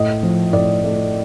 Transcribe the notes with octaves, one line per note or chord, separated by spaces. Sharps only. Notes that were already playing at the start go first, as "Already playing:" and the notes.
Already playing: A2 D#5
F3
A2 D5
A3